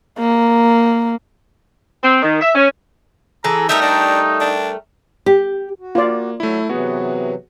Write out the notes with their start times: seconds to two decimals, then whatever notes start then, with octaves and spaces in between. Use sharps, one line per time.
0.19 A#3
2.03 C4
2.22 D#3
2.41 E5
2.55 C#4
3.44 E3 G#4 A4 A#5
3.69 G3 A3 D#4 A#4 E5
3.82 D4
4.41 D4
5.26 G4
5.79 F#4
5.95 A#3 F4 D5
6.40 F#3 A3 E4
6.69 C3 E3 F#3 B3 F#4 G#4